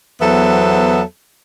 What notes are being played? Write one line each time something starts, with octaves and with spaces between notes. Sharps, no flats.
E2 F#3 B3 A4 C5 E5